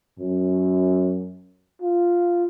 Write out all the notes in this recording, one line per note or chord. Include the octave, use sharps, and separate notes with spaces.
F#2
F4